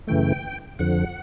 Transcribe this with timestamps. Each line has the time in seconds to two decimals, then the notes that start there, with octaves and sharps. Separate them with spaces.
0.07 F#2 C#3 E3 A3 G5
0.79 F2 D3 F3 F#5